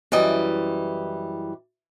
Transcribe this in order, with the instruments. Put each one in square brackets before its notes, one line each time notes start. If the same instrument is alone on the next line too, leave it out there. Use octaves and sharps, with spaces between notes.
[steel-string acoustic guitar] F#2 E3 G3 D#5